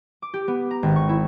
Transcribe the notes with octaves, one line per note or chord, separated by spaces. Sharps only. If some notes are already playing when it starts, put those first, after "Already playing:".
D6
G4
B3
A#5
G#1
C#6
E4